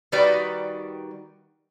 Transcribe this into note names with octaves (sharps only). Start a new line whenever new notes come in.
D#3 G3 D#4 F#4 B4 D5